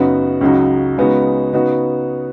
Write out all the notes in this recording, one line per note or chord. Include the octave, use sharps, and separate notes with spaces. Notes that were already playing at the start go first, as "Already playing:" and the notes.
Already playing: F#2 C#3 B3 D#4 F#4
C#2 C#3 F#3 D#4 F#4
C#3 G#3 B3 D#4 F#4
C#3 B3 D#4 F#4